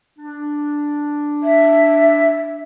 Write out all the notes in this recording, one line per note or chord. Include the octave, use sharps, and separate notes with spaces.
D4
E5